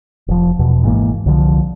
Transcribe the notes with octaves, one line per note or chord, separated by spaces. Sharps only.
F1 F3
E2 B2
G#1 G#2 E3 A#3
C2 D3 E3 F3